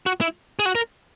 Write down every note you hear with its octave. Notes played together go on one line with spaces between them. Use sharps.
F#4
E4
G#4
F#4
A#4